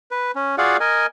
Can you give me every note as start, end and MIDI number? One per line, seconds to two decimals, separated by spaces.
0.11 0.31 71
0.35 0.56 61
0.58 0.77 65
0.58 0.77 66
0.58 0.77 68
0.58 0.77 74
0.58 0.77 77
0.58 0.77 78
0.80 1.06 70
0.80 1.06 75
0.80 1.06 80